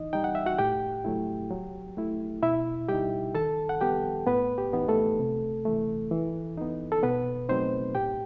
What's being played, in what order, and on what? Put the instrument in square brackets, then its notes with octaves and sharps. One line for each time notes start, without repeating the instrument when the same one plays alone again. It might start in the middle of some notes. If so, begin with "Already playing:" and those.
Already playing: [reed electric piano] E3 D#4 D#5
G3 D#4 G5
F#5
E5
F#4 F#5
A2 G4 G5
F#3 A3 E4
F#3
A3 E4
B2 E4 E5
G3 D#4 G4 G5
D#3 A4 A5
F#5
G3 B3 G4 G5
A2 B3 B4
G4
E3 B3 D#4
A3 A4
C3
E3 A3
E3
B3 D#4
A4
B2 B3 B4
F#3 A3 C4 D#4 C5
A2 G4 G5